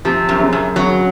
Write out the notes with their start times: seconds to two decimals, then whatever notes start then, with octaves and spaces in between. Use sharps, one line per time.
0.05 C3 F3
0.29 F#2
0.40 C#3
0.53 F#2
0.76 C#3 F#3